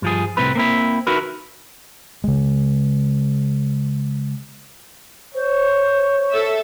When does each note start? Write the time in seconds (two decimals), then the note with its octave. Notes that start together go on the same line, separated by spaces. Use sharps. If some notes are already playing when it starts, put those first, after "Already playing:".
0.02 G2 F3 G#4
0.37 C2 A2 C4 B4
0.56 A#3 C4 E4
1.07 D#4 E4 F#4 A#4 B4
2.24 C#3 G#3
5.35 C5 C#5
6.31 A4 E5